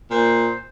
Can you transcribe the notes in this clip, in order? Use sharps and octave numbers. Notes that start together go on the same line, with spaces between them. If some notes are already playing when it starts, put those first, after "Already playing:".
A#2 C5